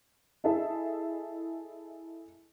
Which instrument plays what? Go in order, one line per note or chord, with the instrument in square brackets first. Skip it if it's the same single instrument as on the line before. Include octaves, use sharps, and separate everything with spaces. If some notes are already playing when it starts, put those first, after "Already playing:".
[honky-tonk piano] E4 G#4 A4 D#5 E5